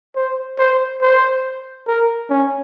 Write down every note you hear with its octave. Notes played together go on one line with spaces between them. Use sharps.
C5
C5
C5
A#4
C#4